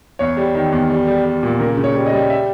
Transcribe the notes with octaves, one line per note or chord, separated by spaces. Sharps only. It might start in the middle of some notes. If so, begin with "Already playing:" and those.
E2 C#5
G3
D#3
E2
G3
G3
G3
A#2
C#3 A#4
C#3
C#5
G3
D#5
G3
E5